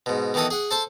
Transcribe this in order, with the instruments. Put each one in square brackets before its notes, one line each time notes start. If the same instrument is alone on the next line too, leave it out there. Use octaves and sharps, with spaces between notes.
[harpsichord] G#2 B2
B2 D#3 E3 A4 F#5 D#6
G#4 F#5
A4 C5 A5